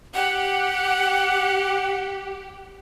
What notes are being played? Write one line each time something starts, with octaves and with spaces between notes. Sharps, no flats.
G4 F#5